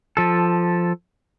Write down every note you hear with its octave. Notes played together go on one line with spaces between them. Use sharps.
F3 A4